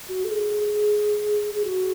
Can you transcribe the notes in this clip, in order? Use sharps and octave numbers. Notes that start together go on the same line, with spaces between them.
F#4
A4
G#4
G#4
F#4